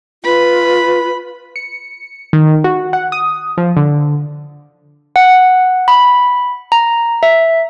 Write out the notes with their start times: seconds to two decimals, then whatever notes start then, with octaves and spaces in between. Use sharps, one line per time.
0.24 F4 B4 B5
1.56 C#7
2.33 D#3
2.64 F#4
2.93 F#5
3.12 D#6
3.58 F3
3.77 D3
5.16 F#5
5.88 B5
6.72 A#5
7.23 E5